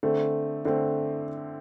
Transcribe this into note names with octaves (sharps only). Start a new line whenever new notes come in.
D3 A3 C4
D3 A3 C4